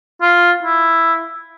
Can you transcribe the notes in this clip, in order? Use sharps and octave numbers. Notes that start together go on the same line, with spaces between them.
F4
E4